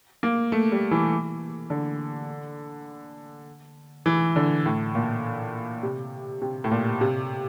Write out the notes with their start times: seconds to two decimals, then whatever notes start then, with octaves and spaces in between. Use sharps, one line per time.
0.23 A#3
0.52 A3
0.72 G3
0.91 E3
1.70 D3
4.06 E3
4.36 D3
4.66 A2
4.95 A#2
5.83 C3
6.42 C3
6.64 A2
6.72 A#2
7.01 C3